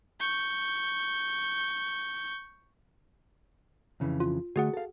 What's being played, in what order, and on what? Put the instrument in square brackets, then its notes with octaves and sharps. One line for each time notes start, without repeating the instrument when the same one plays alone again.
[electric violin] C#6 G6
[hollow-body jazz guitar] F2 C#3 E3
[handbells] F4
[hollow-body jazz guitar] D3 A3 [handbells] F#4 G#4 F#5
[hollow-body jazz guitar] A4 F5